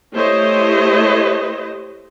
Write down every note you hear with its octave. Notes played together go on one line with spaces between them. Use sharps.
A3 E4 G4 C5 C#5 D#5